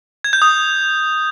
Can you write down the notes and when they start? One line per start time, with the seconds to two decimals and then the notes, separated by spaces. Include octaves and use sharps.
0.24 G#6
0.33 G6
0.42 D#6